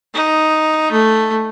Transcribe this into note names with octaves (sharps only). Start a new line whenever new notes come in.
D#4
A3